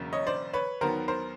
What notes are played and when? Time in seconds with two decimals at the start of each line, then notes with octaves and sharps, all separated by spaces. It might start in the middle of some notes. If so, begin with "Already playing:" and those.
Already playing: E1 E2 C#3 F#3 A#3
0.13 C#5 D#5
0.27 C5 D5
0.53 B4 C#5
0.81 D#2 D#3 F#3 B3 A#4 C5
1.08 A#4 C5